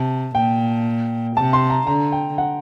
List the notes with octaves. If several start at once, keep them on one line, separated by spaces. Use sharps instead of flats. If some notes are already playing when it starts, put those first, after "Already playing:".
Already playing: C3 A5
A#2 G5
C3 A5
C6
A#5
D3 A#5
G5
F#5